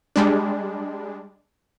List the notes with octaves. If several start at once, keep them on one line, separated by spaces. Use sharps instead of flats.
G3 G#3 D4